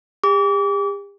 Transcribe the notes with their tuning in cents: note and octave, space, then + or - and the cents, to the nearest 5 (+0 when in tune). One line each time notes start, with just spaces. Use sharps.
G4 +45 D6 -35